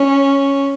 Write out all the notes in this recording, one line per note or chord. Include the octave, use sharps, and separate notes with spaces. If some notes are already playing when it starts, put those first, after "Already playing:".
Already playing: C#4